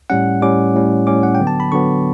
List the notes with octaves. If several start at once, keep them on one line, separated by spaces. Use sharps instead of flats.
A2 G3 C#4 F#5
A2 G3 C#4 D6
A2 G3 C#4
A2 G3 C#4 D6
F#5
G5
D3 F#3 B3
A5
B5
D3 F#3 B3 C#6